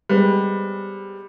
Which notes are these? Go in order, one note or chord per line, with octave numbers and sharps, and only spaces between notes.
G3 G#3 B3 C4